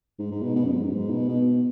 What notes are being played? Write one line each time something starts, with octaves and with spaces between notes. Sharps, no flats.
G#2
G#2
B2
B2
F#2
G#2
F#2
G#2
B2
B2